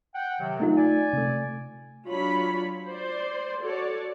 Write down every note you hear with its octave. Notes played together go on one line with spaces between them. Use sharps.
F#5 G5
C3 D#3 F#3
A3 D#4 F4
D5 G#5
C3 A3
F#3 D4 F4 C#5 B5
C5 D5 C6
F#4 A4 C#5 D5